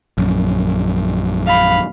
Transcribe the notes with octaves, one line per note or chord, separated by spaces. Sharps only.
A#1 F#2
F5 B5